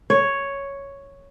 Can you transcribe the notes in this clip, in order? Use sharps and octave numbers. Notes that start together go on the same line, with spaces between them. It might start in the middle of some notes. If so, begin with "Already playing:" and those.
C#5